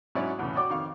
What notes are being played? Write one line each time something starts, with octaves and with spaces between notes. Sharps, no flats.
G#2 F#3 C#4 E4 D5 C#6
E2 A2 C#3
F#4 C#5 D5 G5 D6
F2 D#3 F5 C#6